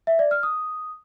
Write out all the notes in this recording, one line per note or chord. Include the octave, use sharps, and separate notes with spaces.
E5
D5
F6
D#6